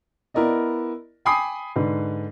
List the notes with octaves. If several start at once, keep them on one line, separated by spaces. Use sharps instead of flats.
B3 E4 A#4 D5 D#5
G5 G#5 B5 D6 D#6 C7
G#2 D3 B4